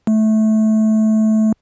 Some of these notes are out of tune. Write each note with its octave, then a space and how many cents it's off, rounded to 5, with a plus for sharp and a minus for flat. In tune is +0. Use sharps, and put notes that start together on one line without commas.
A3 -15